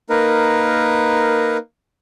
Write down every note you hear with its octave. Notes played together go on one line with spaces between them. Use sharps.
A#3 D#4 A#4 B4